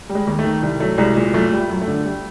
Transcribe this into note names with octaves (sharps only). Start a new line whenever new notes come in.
G3
G#3
D#2
A3
D#3
C2
F#3 A3
C2 G#3
A#2 G#3
F#2 A3
G3
F#2
A3
D3
G3